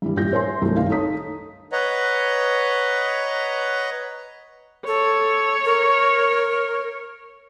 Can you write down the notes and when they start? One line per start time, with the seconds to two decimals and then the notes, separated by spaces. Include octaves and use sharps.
0.02 G2 E3 G3
0.16 E2 A#2 G3 G6 A#6
0.32 A#4 C5 C#5 E5 G#5 C6
0.62 C2 G2 F#3 A3
0.76 F#1 D#3 F5
0.90 D#4 A4 C#5 A#5 D#6 B6
1.72 B4 C#5 D#5 F#5 A#5
4.87 A4 C#5
5.65 A#4